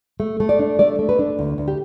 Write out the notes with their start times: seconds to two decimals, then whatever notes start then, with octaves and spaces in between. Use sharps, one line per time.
0.20 A3
0.40 A3
0.49 D5
0.59 D4
0.79 A3 D5
0.99 A3
1.09 B4
1.19 D4
1.39 D2
1.58 D2
1.68 G4